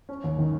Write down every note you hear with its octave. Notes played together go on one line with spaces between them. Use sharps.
C#4
D#2
D#3